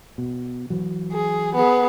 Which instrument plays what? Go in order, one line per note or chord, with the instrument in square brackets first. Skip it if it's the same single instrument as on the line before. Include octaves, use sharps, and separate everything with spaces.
[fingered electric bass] B2
E3 F#3
[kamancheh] G#4
B3 G#4